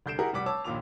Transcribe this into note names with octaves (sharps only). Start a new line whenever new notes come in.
C2 D3 G6 C7 D7 E7
E4 G4 G#4 A#4 F#5
F1 G3 F#5 D6 B6
C#5 A5 D6 E6
A#1 D#2 A#2 D6 F7